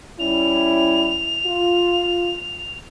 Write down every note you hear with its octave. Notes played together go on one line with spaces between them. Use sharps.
G3 C#4 E4 F7
F4